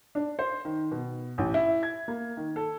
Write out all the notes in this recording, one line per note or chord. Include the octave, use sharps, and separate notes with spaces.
D4
C5
D#3
B2
A1
E4
G#6
A#3
D#3
A4